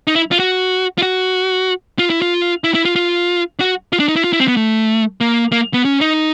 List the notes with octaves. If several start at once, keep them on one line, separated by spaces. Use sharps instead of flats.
D#4
E4
F4
F#4
F4
F#4
F4
E4
F4
E4
E4
F4
F4
F#4
F4
D4
D#4
E4
F4
E4
C4
B3
A3
A#3
A#3
B3
C#4
D#4